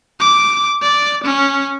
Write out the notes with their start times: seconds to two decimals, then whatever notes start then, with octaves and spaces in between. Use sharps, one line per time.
0.20 D6
0.82 D5
1.24 C#4